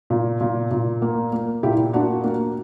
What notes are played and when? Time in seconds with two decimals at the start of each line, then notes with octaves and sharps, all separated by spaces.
0.10 A#2
0.40 A#2
0.71 A#2
1.02 A#3
1.33 A#3
1.63 A#2 E4 G4
1.93 A#3 D4 F#4
2.24 A#3